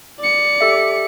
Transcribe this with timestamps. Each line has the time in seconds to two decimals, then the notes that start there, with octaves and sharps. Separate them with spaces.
0.19 D5 C#7
0.61 G4 A4 E5